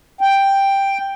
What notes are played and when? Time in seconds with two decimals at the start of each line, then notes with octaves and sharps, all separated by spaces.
0.21 G5